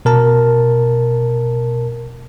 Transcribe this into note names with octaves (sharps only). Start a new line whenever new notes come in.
B2 A#4 A5